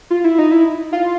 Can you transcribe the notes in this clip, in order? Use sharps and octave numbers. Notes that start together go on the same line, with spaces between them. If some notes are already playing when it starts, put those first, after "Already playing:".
F4
E4
D#4
E4
F4